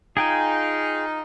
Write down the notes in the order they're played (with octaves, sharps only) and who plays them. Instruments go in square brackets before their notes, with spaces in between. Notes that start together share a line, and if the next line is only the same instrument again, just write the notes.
[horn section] D#4 F4 [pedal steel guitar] G#4 G5 G#5